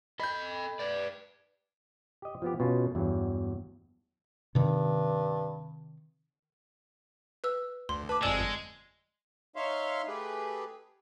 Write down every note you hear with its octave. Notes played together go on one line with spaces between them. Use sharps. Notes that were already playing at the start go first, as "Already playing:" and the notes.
A4 D#5 B5 G6
B4 D5
G4 D#5
F3 B3 G4
B2 C#4 F4
E2 G2 F#3
G2 C3 D#3
B4 E6
D2 C6
B4 A5 D6
G1 F2 G#3 D5 G#5 E6 E7
D#4 C#5 E5 F5 C6
A3 G4 G#4 B4